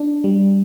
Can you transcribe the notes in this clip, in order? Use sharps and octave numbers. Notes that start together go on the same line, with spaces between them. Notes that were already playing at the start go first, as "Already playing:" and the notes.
Already playing: D4
G3